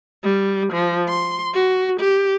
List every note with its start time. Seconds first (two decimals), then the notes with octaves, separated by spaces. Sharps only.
0.24 G3
0.73 F3
1.08 C6
1.54 F#4
2.00 G4